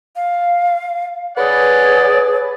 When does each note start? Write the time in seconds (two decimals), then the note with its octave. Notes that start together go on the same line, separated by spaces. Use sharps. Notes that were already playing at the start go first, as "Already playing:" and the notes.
0.16 F5
1.37 G#4 B4 C#5 D5 F#5